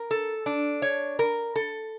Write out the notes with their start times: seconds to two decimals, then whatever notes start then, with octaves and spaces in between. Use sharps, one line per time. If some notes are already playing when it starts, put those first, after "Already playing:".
Already playing: A#4
0.11 A4
0.46 D4
0.82 C#5
1.19 A#4
1.56 A4